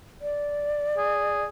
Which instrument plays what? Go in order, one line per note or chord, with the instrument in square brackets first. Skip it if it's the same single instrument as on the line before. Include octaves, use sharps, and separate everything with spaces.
[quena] D5
[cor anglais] G#4